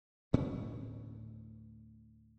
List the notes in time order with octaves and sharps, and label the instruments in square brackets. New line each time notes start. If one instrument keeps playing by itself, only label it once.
[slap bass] D2 A2 B3 C#4